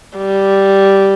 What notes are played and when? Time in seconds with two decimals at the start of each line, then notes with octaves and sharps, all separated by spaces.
0.18 G3